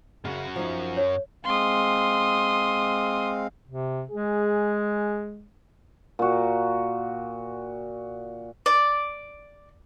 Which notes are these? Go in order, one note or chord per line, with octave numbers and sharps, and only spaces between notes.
F#2 C#3 F#4
F3 D#4
C#5
G#3 C4 F5 C6 D#6
C3
G#3 G#4
A#2 F#4
D5